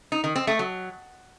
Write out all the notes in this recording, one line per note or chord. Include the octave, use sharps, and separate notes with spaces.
D#4
D#3
C4
A3
F#3